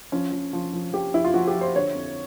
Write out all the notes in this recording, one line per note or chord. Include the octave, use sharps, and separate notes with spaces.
F3 C#4
F3
F3
F3
F3 G4
F3 E4
F4
F3 F#4
G4
F3
C5
D3 C#5
F2